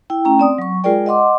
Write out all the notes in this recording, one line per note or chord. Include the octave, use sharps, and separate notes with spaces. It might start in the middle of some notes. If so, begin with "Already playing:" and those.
E4 G5
A3 C#4 G5 A#5
C4 D5 D#6
F#3 C#6
G#3 F4 G#4 A#4 D5 G5
D#5 F#5 C6 D6